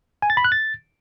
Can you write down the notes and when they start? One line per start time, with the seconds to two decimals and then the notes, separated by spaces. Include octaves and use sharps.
0.22 G#5
0.30 A6
0.37 B5
0.44 F#6
0.52 A6